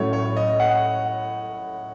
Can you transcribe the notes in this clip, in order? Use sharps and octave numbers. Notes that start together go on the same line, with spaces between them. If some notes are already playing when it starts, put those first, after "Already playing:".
Already playing: A2 F#3 A3 C#4 C#5
C#5
D#5
F#5